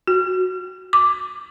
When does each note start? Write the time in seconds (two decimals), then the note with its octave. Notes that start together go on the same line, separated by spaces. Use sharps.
0.08 F#4
0.93 D6